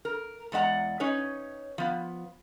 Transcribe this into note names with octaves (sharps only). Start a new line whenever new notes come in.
A#4
E2 G#3 D5 F#5 A#5
C#4 D#4 B4 C#5
F3 B3